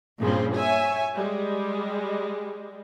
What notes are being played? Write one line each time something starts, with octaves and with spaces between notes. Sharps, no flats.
G2 A#2 C#3 F3 C4
C#5 E5 G#5
G3 G#3